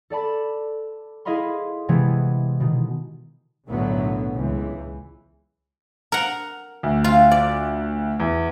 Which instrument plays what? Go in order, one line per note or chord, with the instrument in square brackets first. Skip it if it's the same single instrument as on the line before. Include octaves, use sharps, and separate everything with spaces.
[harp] A4 D5 A5 B5
E4 G#4 D#5 F5 B5 C6
C3 E3 G#3 B3 B4
B2 D#3
[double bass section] B1 F#2 A2 D3 F#3 B3
C#2 E3
[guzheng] A#4 F#5
[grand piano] D2
[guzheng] F4
D5
[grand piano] E2